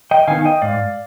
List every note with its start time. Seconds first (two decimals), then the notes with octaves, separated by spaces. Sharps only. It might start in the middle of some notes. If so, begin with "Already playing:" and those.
0.11 D#5 G5
0.28 D#3 B3 D#4 F5 G#5
0.45 D#5 G5
0.62 G#2 D5 F5